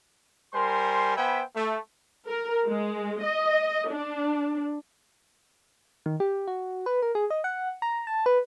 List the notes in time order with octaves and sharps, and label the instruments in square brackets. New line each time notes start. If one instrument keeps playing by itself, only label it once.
[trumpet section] G3 A#4 C5 G#5 C6
B3 C5 E5 G5 G#5 B5
A3
[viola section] A#4
G#3
D#5
D4
[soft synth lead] D#3
G4
F#4
B4
A#4
G#4
D#5
F#5
A#5
A5
B4